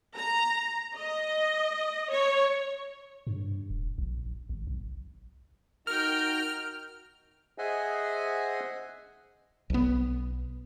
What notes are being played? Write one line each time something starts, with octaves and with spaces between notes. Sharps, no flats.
A#5
D#5
C#5
G2
D#1
A#1
G#1
B1
D#4 F#4 A#4 G5 F6
G#4 C5 D#5 E5 F#5 G#5
B1 B3